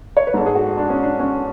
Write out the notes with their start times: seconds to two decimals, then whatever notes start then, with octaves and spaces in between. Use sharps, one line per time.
0.17 C#5
0.27 B4
0.34 G#2 G#3 A4
0.46 G#4
0.55 F#4
0.77 D4
0.90 C#4
1.03 D4
1.20 C#4